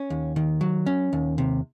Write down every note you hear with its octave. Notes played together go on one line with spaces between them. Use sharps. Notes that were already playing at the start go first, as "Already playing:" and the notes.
Already playing: C#4
D#2
D#3
F#3
C#4
D#2
C3